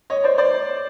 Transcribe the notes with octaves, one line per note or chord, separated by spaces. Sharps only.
C#5 D#5
C5 D5
C5 D5